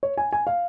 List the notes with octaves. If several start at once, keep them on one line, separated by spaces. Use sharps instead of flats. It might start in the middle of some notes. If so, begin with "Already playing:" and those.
C#5
G#5
G#5
F5